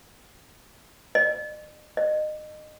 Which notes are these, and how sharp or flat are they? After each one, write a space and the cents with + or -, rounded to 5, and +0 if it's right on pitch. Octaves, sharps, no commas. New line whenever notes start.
D#5 -45
D#5 -25